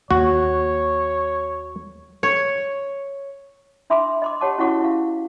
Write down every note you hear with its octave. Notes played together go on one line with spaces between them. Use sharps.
D#2 A#3 F#4 C#5
C#5
D4 E5 B5 C6 D6
D#5 C6 D6
G4 C#5 F#5 A5 D6
C#4 E4 F#4 F#5 C#6 D6
E4 F5